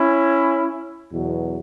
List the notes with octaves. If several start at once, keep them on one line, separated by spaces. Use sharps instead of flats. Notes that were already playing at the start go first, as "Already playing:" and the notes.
Already playing: C#4 E4
E2 B2 F#3